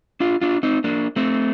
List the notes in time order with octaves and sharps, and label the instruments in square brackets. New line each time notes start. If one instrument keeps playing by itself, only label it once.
[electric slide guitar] D4 F4
D4 F4
C4 D#4
A#3 D4
A3 C4